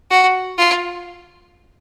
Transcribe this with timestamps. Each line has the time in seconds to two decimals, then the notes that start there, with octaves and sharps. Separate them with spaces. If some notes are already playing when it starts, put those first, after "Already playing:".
0.11 F#4
0.58 F4